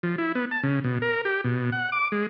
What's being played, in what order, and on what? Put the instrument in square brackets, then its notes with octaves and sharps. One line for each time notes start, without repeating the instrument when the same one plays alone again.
[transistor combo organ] F3
E4
B3
A5
C#3
B2
A#4
G4
B2
F#5
D6
G#3